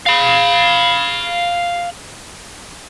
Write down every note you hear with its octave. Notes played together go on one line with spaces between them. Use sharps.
F5 B5